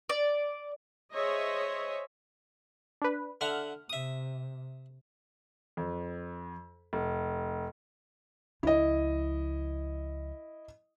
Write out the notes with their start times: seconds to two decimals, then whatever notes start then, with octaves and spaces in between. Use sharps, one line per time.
0.09 D5
1.14 G#4 C5 C#5 D#5 E5
3.02 D4 B4
3.41 D3 E5 F#5 F6
3.90 C3 E5 D#6
5.77 F2
6.93 F1
8.63 C#2 F3 E4 D#5